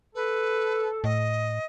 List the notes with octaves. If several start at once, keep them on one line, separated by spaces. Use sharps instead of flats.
A4 B4
A2 D#5